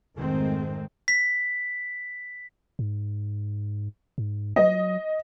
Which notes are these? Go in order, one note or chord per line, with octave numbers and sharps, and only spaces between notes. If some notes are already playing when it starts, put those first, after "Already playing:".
F1 G#2 D#3 G#3 A3 C4
B6
G#2
G#2
F#3 D#5